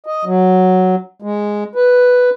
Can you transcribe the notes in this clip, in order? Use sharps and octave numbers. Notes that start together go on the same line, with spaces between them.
D#5
F#3
G#3
B4